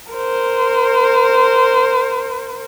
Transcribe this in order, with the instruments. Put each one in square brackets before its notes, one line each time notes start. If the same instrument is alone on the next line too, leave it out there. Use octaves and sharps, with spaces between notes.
[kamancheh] A#4 C5